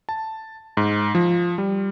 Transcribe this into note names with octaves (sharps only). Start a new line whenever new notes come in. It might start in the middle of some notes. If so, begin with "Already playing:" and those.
A5
G#2
F3
G3